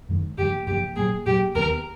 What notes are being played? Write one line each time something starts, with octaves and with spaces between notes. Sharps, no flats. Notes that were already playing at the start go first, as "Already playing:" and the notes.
F#2 D#3 G#3
G2 D3 F3 A#3 G4
G2 D3 F3 A#3 G4
A#2 F#3 A#3 G#4
A#2 F#3 A#3 G4
D#2 D#3 G3 B3 A#4